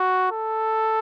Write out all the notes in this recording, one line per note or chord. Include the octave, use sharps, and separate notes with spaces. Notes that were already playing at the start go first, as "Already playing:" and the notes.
Already playing: F#4
A4